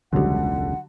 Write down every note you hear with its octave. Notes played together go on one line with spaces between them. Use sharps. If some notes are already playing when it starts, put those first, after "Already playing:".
E1 C#2 D3 F#3 G3 F#5